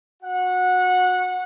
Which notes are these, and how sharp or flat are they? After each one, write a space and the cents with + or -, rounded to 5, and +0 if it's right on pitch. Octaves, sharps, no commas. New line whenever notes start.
F#4 -25 F#5 -20